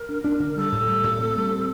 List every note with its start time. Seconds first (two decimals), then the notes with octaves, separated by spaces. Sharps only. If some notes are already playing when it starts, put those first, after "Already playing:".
Already playing: A#4
0.09 D4
0.24 D4
0.40 D3
0.56 G3 A4
0.72 A2
0.87 G3
1.04 A2
1.20 C4
1.36 G3
1.51 C4